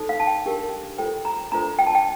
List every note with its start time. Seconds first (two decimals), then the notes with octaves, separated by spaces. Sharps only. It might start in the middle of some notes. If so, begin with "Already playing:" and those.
Already playing: D#4 A4 C5
0.09 F5
0.20 A5
0.27 G5
0.45 D4 G4 A#4
0.98 F4 A4 C5 G5
1.25 A#5
1.52 D4 F4 A4 C5 A#5
1.79 G5
1.87 A5
1.95 G5